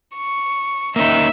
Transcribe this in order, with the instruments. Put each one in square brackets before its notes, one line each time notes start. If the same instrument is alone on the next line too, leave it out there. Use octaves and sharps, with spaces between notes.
[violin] C#6
[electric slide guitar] A#3 C#4 D#4 [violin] E5